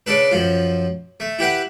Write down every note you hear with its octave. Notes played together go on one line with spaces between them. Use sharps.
C#3 D4 A4 B4
F#2 F3 F4
A3
E4 G4 B4 F#5